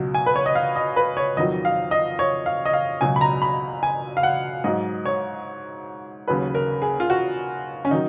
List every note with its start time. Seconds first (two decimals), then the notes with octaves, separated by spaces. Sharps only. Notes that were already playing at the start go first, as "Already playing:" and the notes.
Already playing: C#2 B2 F#3
0.14 G#5
0.26 B4
0.36 C#5
0.46 D#5
0.55 F5
0.76 D#5
0.96 B4
1.17 C#5
1.37 F2 D#3 F#3 D#5
1.65 F5
1.91 D#5
2.19 C#5
2.46 F5
2.65 D#5
2.73 F5
3.01 C#2 B2 F#3 G#5
3.16 B5
3.21 A#5
3.42 B5
3.83 G#5
4.17 F5
4.23 F#5
4.64 G#2 F#3 D#5
5.06 C#5
6.28 D#2 C#3 F#3 B4
6.55 A#4
6.82 G#4
7.00 F4
7.10 F#4
7.85 C#4
7.91 D#3 F#3 D#4